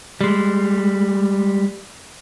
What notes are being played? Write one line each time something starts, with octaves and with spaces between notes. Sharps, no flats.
G3 G#3